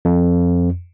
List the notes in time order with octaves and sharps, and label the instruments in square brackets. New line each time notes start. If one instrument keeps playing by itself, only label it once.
[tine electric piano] F2